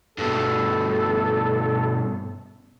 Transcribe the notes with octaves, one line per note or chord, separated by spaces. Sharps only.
G2 B2 A4